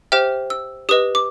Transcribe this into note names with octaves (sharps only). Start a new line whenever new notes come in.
G4 C5 E5 G5 F6
E6
G4 B4 D#5 D#6
D6